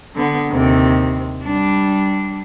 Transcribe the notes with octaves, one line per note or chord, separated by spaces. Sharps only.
D3 B3
D#2 C3
G3 D4